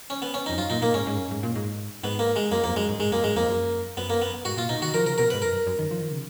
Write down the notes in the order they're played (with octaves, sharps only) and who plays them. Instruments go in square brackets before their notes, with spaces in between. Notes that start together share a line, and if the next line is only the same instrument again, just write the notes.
[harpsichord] C#4
B3
C#4
[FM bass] F2 [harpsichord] D#4
[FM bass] F#2 [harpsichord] F4
[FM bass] A#2 [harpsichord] D#4
[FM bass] A#2 [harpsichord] A#3
[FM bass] G#2 [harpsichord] C#4
[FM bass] G#2
F#2
G#2
A#2
G#2
[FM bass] G#2 [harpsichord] B3
[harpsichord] A#3
G#3
[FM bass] F#2 [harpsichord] A#3
[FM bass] F2 [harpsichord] A#3
[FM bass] F#2 [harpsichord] G#3
[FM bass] G#2
[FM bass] G#2 [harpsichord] G#3
[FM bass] F#2 [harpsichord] A#3
[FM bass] G#2 [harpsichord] G#3
[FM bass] F2 [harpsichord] A#3
[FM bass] F#2
[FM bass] F#2 [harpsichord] B3
[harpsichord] A#3
B3
[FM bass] G#2 [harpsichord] F#4
[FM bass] A#2 [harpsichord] F4
[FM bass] B2 [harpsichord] D#4
[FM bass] D#3 [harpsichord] F#4
[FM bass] F3 [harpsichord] A#4
[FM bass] C#3 [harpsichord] A#4
[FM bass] B2 [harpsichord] A#4
[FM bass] G#2 [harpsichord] B4
[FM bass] F#2 [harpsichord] A#4
[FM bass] F2
F#2
F#2
D#3
F3
D#3
C#3